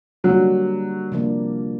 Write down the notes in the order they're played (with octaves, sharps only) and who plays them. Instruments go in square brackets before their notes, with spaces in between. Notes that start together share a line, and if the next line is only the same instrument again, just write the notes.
[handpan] D3 G3 A#3 D4 F#4 [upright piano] F#3
[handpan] C3 F3 A#3 D4